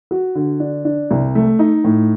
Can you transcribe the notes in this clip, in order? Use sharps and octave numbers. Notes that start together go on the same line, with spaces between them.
F#4
D3
D4
D4
C2
A3
D#4
A2